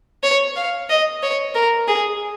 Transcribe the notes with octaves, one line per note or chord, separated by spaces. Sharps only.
C#5
F5
D#5
C#5
A#4
G#4